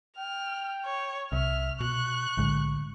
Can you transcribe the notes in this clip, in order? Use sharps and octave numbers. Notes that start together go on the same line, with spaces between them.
G5 F6
C#5
C2 C3 E5 F6
B2 C#6 F#6
B1 A2 D3 G#3